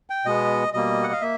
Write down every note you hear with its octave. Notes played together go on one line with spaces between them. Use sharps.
G5
B2 G#3 B3 D#5
B2 G3 A#3 D#5
F#5
F5
A#3 E5